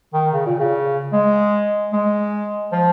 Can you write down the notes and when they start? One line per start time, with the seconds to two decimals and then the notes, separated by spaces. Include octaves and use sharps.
0.14 D#3
0.33 C#3
0.46 A#2
0.60 C#3
1.13 G#3
1.93 G#3
2.72 F3